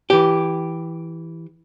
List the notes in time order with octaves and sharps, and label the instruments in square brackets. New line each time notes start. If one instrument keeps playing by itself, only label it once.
[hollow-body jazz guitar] E3 G4